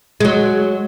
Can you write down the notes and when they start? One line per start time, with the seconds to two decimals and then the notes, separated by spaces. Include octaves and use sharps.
0.20 F#3 G#3